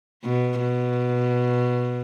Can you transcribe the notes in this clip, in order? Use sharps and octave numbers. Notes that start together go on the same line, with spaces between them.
B2
B2